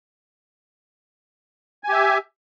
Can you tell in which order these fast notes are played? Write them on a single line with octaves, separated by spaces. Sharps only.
G#5 G4 E5